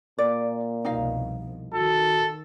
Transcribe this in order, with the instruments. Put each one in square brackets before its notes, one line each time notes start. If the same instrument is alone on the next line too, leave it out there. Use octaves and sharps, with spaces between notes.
[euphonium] A#2 [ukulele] D5
[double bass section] C2 F2 B2 [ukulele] D#4 D#5 F5
[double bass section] D#3 [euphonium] F#4 [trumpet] A4